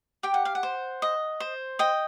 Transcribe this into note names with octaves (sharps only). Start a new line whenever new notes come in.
G4 G5
F#5
F5
F#5
C5
D#5
C5
D#5 G5